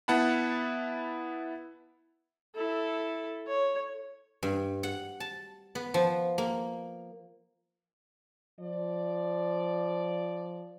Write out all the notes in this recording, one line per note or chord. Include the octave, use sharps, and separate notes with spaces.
B3 E4 F#5 A5 B5
E4 A4
C#5
G2
F#5
A5
B3
F3
A#3
F3 D5